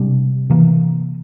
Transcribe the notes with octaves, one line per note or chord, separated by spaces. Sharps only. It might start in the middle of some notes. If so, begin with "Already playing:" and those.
Already playing: C3 G3 D4
C3 E3 A#3